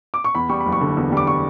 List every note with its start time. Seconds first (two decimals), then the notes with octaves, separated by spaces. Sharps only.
0.14 D6
0.24 C#6
0.35 E2 B5
0.49 G3 C#6
0.61 B5
0.66 F#1
0.72 C#6
0.81 D3
0.97 E2
1.12 G3 D6
1.27 C#6